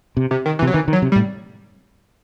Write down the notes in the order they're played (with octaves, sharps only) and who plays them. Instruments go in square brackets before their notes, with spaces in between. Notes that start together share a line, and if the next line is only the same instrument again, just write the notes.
[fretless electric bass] C3
[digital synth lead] C3
D#3
E3
[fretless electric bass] C3 [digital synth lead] F#3
[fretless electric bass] D#3 [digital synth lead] E3
[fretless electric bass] D#3
[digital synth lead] F#3
[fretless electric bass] C3
[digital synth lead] G3
[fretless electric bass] A2